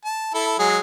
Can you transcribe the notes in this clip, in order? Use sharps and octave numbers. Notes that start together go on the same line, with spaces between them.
A5
E4 A4
F#3 G#3 G#4